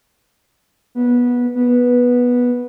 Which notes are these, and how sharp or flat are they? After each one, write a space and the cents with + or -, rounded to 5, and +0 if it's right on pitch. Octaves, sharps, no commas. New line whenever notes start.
B3 -15
B3 -10